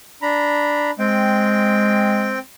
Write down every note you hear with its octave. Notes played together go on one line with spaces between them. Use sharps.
D4 A#5 B5
G#3 C4 G5